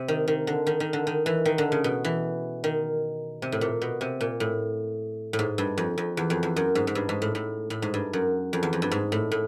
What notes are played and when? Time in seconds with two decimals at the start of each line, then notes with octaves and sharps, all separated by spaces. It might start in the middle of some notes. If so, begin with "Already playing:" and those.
Already playing: C3
0.08 D#3
0.28 D#3
0.47 D3
0.67 D#3
0.80 D#3
0.93 D3
1.07 D#3
1.26 E3
1.45 D#3
1.58 D3
1.72 C#3
1.84 B2
2.04 E3
2.64 D#3
3.42 C3
3.52 A2
3.61 A#2
3.82 B2
4.01 C3
4.21 A#2
4.40 A2
5.33 A2
5.39 G#2
5.58 G2
5.78 F2
5.98 F2
6.17 E2
6.30 F2
6.43 E2
6.56 F#2
6.75 G#2
6.87 G#2
6.95 G2
7.09 G#2
7.22 A2
7.35 A2
7.70 A2
7.82 G#2
7.94 G2
8.13 F#2
8.53 F2
8.63 E2
8.73 F2
8.82 G2
8.91 G#2
9.12 A2
9.32 A2